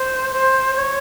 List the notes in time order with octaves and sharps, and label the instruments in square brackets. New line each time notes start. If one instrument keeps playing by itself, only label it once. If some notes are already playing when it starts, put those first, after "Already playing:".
Already playing: [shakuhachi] C5
C5
C#5